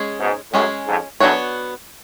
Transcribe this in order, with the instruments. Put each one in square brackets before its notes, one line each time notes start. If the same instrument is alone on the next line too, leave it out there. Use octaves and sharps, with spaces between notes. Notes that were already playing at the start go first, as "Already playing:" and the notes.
Already playing: [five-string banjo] G#3 C#4 G#4
[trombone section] G#2 B2
[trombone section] F#2 A2 [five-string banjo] G#3 C#4 G#4
[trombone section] F2 G#2
[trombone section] F#2 A2 [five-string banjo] B3 D4 F#4 C#5